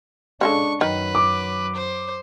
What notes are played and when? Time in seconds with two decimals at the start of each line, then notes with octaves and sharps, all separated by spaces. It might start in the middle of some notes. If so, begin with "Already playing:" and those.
0.41 C#3 G#3 D4 A4 C#6
0.81 F#2 D#3 F#3 B4
1.15 D6
1.75 C5